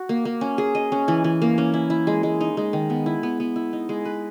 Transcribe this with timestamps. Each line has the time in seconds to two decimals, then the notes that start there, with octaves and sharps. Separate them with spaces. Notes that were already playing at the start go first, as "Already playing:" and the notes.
Already playing: F#4
0.09 A#3
0.25 A#3
0.41 C#4
0.58 G#4
0.75 D#5
0.92 C#4
1.08 E3
1.24 E3
1.42 A#3
1.58 C#4
1.74 E4
1.90 E4
2.07 G#3
2.23 G#3
2.41 D#4
2.57 G#3
2.73 D#3
2.90 B3
3.06 E4
3.23 B3
3.40 B3
3.56 E4
3.73 D#4
3.89 G#3
4.05 B4